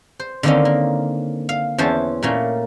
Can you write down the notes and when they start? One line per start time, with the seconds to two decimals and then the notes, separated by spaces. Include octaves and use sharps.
0.20 C5
0.43 D3 D#3 A#3 C4 C#4 D#4
0.65 A#3
1.49 F5
1.78 E2 E3 C#4 C5 A5
2.23 A#2 A3 A#3 C#4